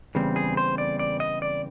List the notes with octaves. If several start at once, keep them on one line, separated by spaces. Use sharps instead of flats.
E2 C#3 G3 C4
G#4
C5
D5
D5
D#5
D5